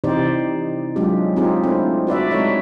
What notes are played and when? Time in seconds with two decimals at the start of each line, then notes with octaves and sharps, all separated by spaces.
0.04 C3 E3 D#4 G4 C5 D5
0.96 F#3 G#3 D4 F4 G4
1.36 C4 D#4 F4 G4 G#4
1.63 A3 C4 D4 E4
2.07 F#4 B4 D5 E5
2.31 G#3 C4 D#4 A4 C#5 E5